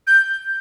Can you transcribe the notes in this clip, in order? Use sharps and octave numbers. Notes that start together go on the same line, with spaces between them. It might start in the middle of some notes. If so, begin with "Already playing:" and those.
G6